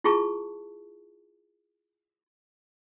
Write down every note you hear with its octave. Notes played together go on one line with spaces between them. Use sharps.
E4 F4 G#4 A5 C#6